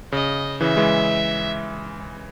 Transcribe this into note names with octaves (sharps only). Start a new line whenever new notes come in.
C#3 D#5
C#3 E3 E5
E3 G#3